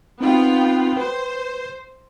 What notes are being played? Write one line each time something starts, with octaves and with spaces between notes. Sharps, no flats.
B3 C4 D#4 F4 G5
B4 C5